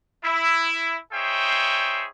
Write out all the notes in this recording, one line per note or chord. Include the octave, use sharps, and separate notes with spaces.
E4
D#4 G#4 C5 C#5 E5 G5